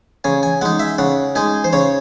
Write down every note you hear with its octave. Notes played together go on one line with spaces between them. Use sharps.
C#3 G#5
G#5
G#3 D#4 F#5
E5
C#3 F#5
G#3 D#4 G#5
C5
C#3 C#5